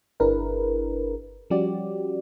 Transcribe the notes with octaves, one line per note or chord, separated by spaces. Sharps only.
G1 D4 E4 G#4 A#4 B4
F3 G3 C#4 F#4 G4 D5